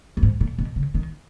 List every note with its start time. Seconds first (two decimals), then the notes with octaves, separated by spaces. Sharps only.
0.17 F#2
0.23 G#2
0.41 A#2
0.58 B2
0.76 C#3
0.95 D#3